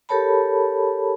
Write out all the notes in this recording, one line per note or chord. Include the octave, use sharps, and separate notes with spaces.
G4 A4 A#4 C#5 A5 B5